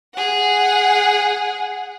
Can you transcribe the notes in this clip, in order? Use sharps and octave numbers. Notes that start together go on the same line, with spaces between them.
G#4 F#5